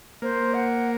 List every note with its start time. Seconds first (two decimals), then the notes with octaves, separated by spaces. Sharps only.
0.22 A#3 C5
0.54 F#5